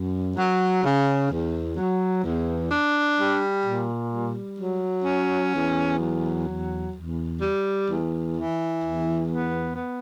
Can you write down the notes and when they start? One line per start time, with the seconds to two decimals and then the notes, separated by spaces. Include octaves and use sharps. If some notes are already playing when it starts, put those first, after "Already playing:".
Already playing: F#2
0.35 F#3
0.81 C#3
1.29 E2
1.76 F#3
2.22 E2
2.70 D4
3.17 G3
3.64 A#2
4.11 G3
4.57 F#3
5.04 C#4
5.52 E2
5.99 F#3
6.46 E2
6.93 E2
7.40 G3
7.87 E2
8.34 E3
8.81 E2
9.28 B3
9.74 B3